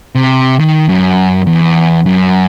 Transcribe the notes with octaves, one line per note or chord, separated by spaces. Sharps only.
C3
D#3
F#2
E2
F#2